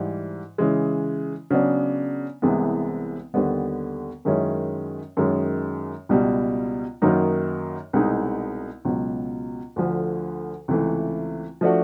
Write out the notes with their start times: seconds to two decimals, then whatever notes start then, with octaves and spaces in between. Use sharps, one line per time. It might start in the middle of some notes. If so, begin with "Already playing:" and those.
Already playing: G#2 E3 G3
0.58 C#3 E3 G#3
1.50 C#3 F#3 B3 D4
2.42 C2 C3 E3 G#3 B3
3.34 D#2 D3 G3 B3
4.25 F#2 D#3 G#3 C#4 E4
5.17 F#2 D#3 G#3 C#4
6.09 C#2 B2 G3
7.02 F#2 D#3 F#3 A#3 D#4
7.93 C2 B2 G#3 B3 D#4
8.85 C#2 B2 F#3
9.76 D2 D3 F3
10.68 C#2 C3 E3 A3
11.61 F3 A3 D4 F#4